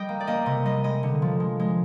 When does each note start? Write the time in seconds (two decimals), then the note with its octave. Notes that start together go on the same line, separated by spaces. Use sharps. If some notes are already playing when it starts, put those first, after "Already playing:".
Already playing: G3 D#5 G5
0.09 A#3
0.20 D5
0.27 A#3 D#5
0.46 C3 D#5
0.65 G3 D#5
0.84 G#3 D#5
1.03 D3
1.22 F3
1.40 G#3
1.60 G#3